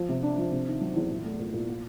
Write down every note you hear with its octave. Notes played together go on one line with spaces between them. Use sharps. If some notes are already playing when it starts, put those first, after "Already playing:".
Already playing: F3
C3
D4
F3
C3
D#3
F#3
E2
A#2
A3
A#2
A#2
A#3